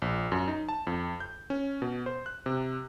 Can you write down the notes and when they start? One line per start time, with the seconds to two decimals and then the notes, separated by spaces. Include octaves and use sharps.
0.02 A#1
0.32 F#2
0.48 D#4
0.69 A5
0.87 F2
1.20 G6
1.50 C#4
1.82 B2
2.06 C5
2.26 F#6
2.46 C3